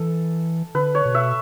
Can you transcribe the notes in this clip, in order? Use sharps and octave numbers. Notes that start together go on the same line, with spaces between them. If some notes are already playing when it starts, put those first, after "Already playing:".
Already playing: E3 A4
D3 B4
C#5
B2
E5